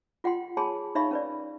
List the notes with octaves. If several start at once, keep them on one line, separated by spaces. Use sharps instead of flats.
F4 F#5 G5 C6
G#4 C#5 G#5 A5 B5 C6
D#4 C#5 E5 F5 B5 C#6
C#4 B4 D5